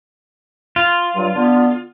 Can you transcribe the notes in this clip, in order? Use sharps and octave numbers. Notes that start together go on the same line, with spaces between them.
F4
G2 F#3
D3 B3